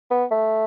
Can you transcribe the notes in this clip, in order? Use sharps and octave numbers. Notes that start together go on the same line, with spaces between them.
B3
A3